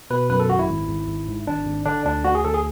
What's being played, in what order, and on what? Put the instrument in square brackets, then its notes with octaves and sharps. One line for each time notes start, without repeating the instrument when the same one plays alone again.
[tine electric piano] B2 B4
F#2 B4
A4
G#1 F#4
E4
G#1
G#1
G#1
G#2
G#1 D4
G#1
D3 D4
D2 D4
D2 F#4
G#4
D2 A4
G#4